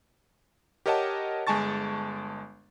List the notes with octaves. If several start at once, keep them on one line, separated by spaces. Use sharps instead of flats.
G4 A#4 C#5 D#5 F#5 A5
G1 G#3 G#5 A5 C#6 A6